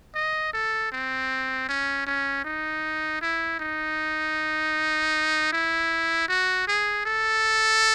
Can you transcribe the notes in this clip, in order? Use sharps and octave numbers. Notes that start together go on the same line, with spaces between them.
D#5
A4
C4
C#4
C#4
D#4
E4
D#4
E4
F#4
G#4
A4